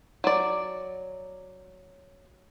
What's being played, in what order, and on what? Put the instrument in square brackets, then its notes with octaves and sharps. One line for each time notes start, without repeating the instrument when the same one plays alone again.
[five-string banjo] F#3 D5